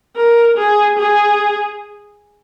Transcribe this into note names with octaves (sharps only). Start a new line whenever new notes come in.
A#4
G#4
G#4